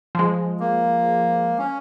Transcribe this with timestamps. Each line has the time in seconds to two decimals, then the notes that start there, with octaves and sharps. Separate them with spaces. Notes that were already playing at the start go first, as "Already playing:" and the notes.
0.15 F3 G#3
0.60 A#3
1.58 C#4